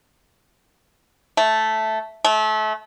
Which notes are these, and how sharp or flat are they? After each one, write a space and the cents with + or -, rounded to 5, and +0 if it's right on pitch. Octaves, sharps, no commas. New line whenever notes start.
A3 -5
A3 -30